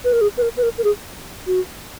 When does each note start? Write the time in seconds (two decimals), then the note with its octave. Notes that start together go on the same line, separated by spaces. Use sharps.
0.04 B4
0.13 A#4
0.21 G#4
0.37 B4
0.42 A#4
0.57 B4
0.63 A#4
0.78 A#4
0.84 G#4
1.47 F#4